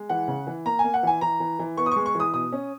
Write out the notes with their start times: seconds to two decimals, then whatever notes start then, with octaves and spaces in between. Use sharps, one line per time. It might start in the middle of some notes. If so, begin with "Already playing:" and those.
Already playing: G#3
0.09 E3 F#5
0.28 C#3
0.47 E3
0.65 A#3 A#5
0.79 G#5
0.84 A#3
0.94 F#5
1.03 E3 G#5
1.21 E3 A#5
1.40 E3
1.59 E3
1.77 B3 C#6
1.86 D#6
1.91 G#3 C#6
2.06 C#6
2.15 E3 D#6
2.33 B2 D#6
2.52 C#4